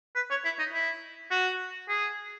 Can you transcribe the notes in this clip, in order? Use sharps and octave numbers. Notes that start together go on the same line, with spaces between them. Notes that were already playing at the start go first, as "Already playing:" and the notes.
B4
C#5
E4
D#4
E4
F#4
G#4